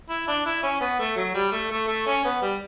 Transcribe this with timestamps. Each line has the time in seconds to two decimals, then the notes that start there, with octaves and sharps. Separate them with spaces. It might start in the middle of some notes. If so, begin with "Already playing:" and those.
0.10 E4
0.28 D4
0.46 E4
0.63 C#4
0.81 B3
1.00 A3
1.17 F#3
1.34 G3
1.52 A3
1.71 A3
1.88 A3
2.07 C#4
2.25 B3
2.42 G3